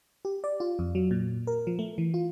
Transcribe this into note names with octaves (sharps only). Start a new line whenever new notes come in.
G4
D5
F4
F2
F#3
A#2
A#4
F3
A3
E3
F4